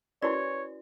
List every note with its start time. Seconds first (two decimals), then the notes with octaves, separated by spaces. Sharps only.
0.22 C#4 E4 F#4 B4 C#5 D5